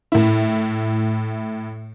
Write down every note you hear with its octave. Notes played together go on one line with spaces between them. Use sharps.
A2 E4